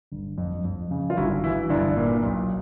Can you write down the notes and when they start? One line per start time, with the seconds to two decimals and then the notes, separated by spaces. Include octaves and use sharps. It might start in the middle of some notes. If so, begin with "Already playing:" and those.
0.12 G1
0.38 F2
0.65 F2
0.91 C#3
1.10 F4
1.17 G1 E4 F#4
1.43 E3 E4 F#4
1.69 G1 D4 E4
1.96 A#2
2.23 B1